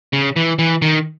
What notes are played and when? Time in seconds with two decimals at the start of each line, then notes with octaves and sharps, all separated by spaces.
0.13 C#3
0.36 E3
0.59 E3
0.82 D#3